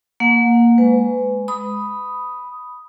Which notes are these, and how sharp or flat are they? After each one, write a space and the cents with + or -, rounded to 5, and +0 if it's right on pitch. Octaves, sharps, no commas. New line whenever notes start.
A#3 +0 F#5 -35
G#3 +0 B4 +30
B5 +0 D#6 +0